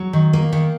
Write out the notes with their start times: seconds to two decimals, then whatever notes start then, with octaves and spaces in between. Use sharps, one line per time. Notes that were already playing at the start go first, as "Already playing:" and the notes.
Already playing: F#3
0.13 D#3
0.33 A#3
0.52 D#3